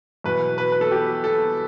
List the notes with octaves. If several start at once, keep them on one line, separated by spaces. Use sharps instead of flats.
E2 B2 F#3 B4
B4
B4
A4
G4
A4